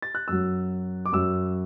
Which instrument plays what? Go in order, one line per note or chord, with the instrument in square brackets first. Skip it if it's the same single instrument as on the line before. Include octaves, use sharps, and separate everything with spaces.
[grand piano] A6
F#6
F#2 F#3 E6
D6
F#2 F#3 E6